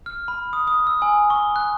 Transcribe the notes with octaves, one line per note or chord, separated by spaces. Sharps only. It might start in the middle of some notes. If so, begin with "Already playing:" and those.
F6
B5
D#6
D#6
E6
G#5
C#6
F#6